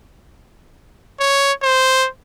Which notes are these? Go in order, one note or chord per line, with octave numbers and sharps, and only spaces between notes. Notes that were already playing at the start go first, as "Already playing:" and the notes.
C#5
C5